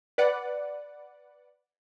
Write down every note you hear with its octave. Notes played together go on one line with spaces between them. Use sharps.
B4 D5 F#5